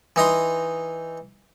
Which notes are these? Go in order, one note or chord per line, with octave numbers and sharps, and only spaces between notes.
E3 D#4 A#5 C6